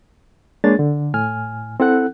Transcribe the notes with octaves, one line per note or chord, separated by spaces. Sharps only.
G#3 A#3 D4 G#4 C#5 A6
D3
A2 G#5 F6
C4 E4 A4 F#5 F#6